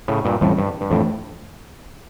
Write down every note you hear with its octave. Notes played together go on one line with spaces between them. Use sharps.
A2 C#3
G2 A#2
F2 A2 E3 G3 C#4
G2
G2
F2 A2 E3 A3 D4